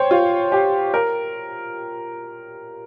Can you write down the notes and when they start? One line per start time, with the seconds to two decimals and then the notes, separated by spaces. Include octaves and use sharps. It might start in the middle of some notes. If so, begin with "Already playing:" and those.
Already playing: C5 C#5 G5
0.11 F4
0.52 G4
0.94 A#4